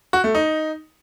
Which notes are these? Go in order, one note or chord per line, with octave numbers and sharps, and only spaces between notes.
F#4
A3
D#4